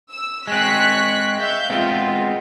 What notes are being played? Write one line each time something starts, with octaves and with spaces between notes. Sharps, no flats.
E6
G#3 C4 C#6 F#6 B6
E5 F5 G6
G#3 B3 C4 F4